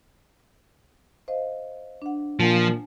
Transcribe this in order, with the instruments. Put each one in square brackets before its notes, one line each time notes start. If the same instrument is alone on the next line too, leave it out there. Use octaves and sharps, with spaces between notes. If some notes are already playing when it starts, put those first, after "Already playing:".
[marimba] C5 D#5 F5
D4 F#5
[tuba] A#2 [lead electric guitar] F3 [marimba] F#5 G#5 A5